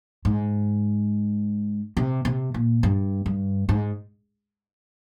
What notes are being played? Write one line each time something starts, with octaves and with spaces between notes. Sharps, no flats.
G#2
C3
C3
A#2
G2
G2
G#2